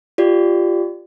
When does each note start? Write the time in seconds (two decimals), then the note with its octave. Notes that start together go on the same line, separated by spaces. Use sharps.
0.18 F4 G4 D5